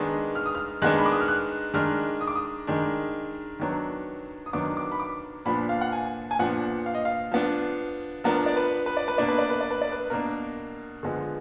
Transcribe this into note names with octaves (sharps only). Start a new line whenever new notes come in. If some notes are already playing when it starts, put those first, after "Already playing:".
Already playing: D#3 G#3 B3 D4 D#6
F6
D#6
F6
D#3 G#3 B3 D4 F#6
B5
D6
D#6
F6
F#6
D#3 G#3 D4 F6
D#6
D6
D#6
D#3 G#3 D4
D#3 F#3 B3 D4
D#6
D#3 F#3 B3 D4 D6
D6
B5
D6
A#2 F3 B3 D4 B5
F5
F#5
G#5
G#5
A#2 F3 B3 D4 F#5
F5
D#5
F5
F3 B3 D4
F3 B3 D4 A#4
D5
B4
B4
D5
B4
B2 A#3 D4 D5
B4
D5
B4
D5
B4
D5
B4
B2 A#3 D4 A#4
D3 F3 G#3 B3